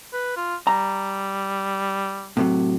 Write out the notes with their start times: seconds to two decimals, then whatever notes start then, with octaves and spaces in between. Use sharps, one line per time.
0.13 B4
0.36 F4
0.67 G3 A#5
2.37 A2 C3 F#3